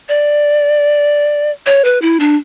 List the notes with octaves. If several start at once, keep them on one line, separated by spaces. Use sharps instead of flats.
D5
C#5
B4
E4
D4